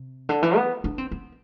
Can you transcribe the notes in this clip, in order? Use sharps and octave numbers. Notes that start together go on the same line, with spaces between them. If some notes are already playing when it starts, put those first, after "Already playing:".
Already playing: C3
D3
E3
B3
D4
C4
B3